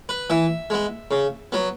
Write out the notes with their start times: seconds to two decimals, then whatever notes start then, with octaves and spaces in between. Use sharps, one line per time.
0.09 B4
0.30 E3 E5
0.70 G#3 B3
1.11 C#3
1.52 F#3 B3